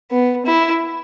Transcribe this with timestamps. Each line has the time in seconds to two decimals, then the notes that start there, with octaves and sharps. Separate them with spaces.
0.11 B3
0.46 E4